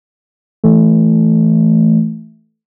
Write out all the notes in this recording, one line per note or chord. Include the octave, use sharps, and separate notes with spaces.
E3 A3